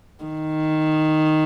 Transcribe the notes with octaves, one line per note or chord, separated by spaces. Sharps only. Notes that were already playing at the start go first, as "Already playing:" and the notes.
D#3